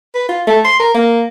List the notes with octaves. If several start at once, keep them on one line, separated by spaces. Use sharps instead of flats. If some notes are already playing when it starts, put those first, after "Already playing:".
B4
F4
A3
C6
A#4
A#3